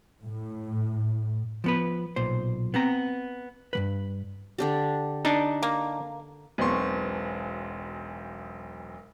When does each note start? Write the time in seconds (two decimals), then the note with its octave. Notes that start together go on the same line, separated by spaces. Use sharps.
0.24 A2
1.64 F3 B3 B4
2.16 B1 A#2 C5
2.74 B3 C4 A#5
3.73 G2 F#3 B4
4.58 D3 D4 G4
5.25 D4 D#4 A5
5.63 A#3
6.58 E1 B1 B3 C4 C6 C#6